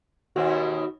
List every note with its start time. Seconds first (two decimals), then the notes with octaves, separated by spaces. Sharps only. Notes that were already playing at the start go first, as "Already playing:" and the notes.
0.36 D#2 B2 C4 F#4